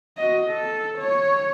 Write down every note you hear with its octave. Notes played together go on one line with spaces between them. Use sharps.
F#4 D#5
A4
C#5